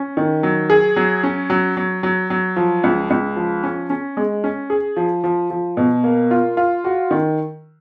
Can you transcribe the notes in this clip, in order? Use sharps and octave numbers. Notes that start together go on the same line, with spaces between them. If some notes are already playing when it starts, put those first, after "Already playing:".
Already playing: C#4
D#3
F#3
G#4
F#3
C#4
F#3
F#3
F#3
F#3
F3
C#2
C#2
F3
C#4
C#4
G#3
C#4
G#4
F3
F3
F3
B2
A#3
F4
F4
F#4
D#3